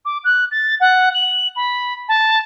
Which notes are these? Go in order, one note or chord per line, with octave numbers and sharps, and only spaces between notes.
D6
F#6
A6
F#5
F#7
B5
A5